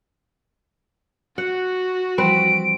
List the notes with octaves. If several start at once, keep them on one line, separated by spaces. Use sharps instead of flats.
F#4 F#5
E3 F3 G3 C4 B4 D7